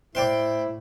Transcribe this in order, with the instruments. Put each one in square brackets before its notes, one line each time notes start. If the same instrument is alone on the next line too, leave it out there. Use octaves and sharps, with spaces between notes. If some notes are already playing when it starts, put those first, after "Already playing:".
[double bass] A2 [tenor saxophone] E4 [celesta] C5 [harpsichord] D5 G5 C6